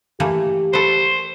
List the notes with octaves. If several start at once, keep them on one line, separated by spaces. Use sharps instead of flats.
E3 A3 A#3 G4
A4 B4 C5